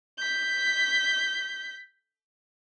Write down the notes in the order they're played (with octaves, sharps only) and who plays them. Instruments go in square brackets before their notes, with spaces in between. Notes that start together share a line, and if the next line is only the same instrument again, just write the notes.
[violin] G6 B6